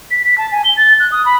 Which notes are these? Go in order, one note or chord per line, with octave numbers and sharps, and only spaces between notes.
B6
B6
A5
G#5
G7
A6
F#6
D#6
B5